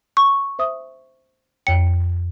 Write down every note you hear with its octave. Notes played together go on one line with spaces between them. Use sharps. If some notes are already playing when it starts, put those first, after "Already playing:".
C#6
C5 E5 D#6
F2 C#5 G5 C#7